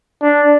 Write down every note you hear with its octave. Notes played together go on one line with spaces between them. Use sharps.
D4